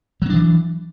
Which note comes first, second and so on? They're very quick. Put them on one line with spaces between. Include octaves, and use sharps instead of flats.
F#3 C4 D4 E3